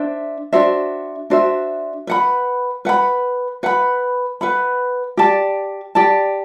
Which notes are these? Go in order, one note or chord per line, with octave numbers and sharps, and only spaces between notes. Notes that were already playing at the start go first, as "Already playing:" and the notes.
Already playing: D4 C5 E5
D4 F#4 C5 E5
D4 F#4 C5 E5
B4 F#5 B5
B4 F#5 B5
B4 F#5 B5
B4 F#5 B5
G4 D5 A5
G4 D5 A5